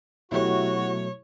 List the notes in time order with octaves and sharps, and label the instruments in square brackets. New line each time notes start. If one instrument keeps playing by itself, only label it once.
[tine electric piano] B2 F#3 A3 [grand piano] E4 G4 [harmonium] F#4 [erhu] C#5